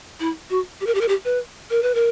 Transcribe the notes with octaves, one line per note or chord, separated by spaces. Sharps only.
E4
F#4
G4
A#4
G4
A#4
G4
B4
A#4
B4
A#4